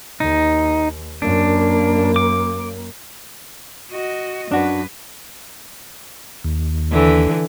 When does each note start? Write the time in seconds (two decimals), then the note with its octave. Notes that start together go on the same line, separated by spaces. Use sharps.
0.20 D#2 D#4
1.22 F#2 A#3 D4
2.16 D6
3.92 F#4 D#5
4.52 F#2 D4 F#4 B4
6.44 D#2
6.91 D3 E3